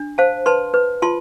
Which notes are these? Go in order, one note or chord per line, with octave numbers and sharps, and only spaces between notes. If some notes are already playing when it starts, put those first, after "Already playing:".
Already playing: D4
C5 F5 A5
B4 A5 C6
B4
F4 A5 C6